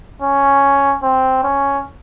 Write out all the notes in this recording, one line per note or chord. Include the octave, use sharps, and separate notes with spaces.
C#4
C4
C#4